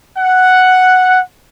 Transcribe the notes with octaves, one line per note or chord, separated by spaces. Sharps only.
F#5